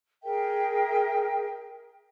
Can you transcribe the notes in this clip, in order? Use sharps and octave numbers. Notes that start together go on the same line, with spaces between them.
G#4 A#4 E5 G5